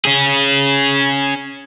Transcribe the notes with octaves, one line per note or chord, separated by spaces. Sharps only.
C#4 G#4